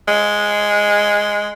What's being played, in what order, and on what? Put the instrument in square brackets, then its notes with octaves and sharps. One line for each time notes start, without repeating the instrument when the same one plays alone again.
[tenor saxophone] G#3